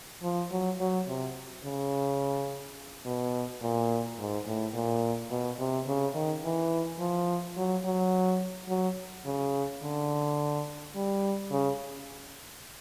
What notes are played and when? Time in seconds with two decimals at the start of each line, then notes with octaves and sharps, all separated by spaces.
0.23 F3
0.52 F#3
0.80 F#3
1.08 C3
1.65 C#3
3.05 B2
3.62 A#2
4.18 G#2
4.47 A2
4.74 A#2
5.31 B2
5.59 C3
5.87 C#3
6.15 D#3
6.44 E3
6.99 F3
7.57 F#3
7.85 F#3
8.69 F#3
9.25 C#3
9.82 D3
10.95 G3
11.51 C#3